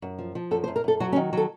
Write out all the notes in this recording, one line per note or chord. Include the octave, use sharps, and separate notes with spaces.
F#2
F3
F3
F#2 A4
C5
F#2
A#4
F#2 A4
F#3 F#4
C#4
D#3
F#3 A4